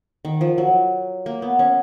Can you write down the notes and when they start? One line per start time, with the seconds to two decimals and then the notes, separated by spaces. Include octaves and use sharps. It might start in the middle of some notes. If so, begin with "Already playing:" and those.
0.25 D#3
0.41 F3
0.58 F#3
1.26 A#3
1.42 B3
1.59 C#4